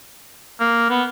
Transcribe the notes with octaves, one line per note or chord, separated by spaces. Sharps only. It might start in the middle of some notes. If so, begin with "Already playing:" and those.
A#3
B3